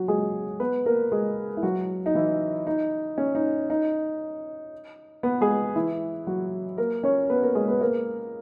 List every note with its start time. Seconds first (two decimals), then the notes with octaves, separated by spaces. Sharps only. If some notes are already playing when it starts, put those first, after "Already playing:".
Already playing: F#3 F#4
0.08 G#3 G#4
0.60 B3 B4
0.86 A#3 A#4
1.12 G#3 G#4
1.57 E4
1.63 F#3 F#4
2.06 D#4
2.15 E3 E4
2.67 D#4
3.18 C#4
3.35 D#4
3.70 D#4
5.23 B3 B4
5.41 G#3 G#4
5.76 E3 E4
6.27 F#3 F#4
6.78 A#3 A#4
7.03 C#4 C#5
7.30 B3 B4
7.42 A#3 A#4
7.55 G#3 G#4
7.68 B3 B4
7.81 A#3 A#4